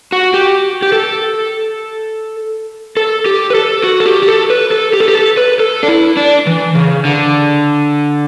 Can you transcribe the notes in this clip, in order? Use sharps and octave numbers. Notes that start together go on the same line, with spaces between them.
F#4
G4
G4
A4
A4
G4
B4
A4
F#4
A4
G4
G4
A4
B4
A4
G4
A4
G4
A4
B4
A4
D4
E4
D4
E3
C#3
D3